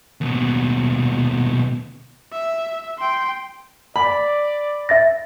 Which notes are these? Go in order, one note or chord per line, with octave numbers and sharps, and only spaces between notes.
D#2 B2
E5
G5 C6
D5 B5
E5 A6 A#6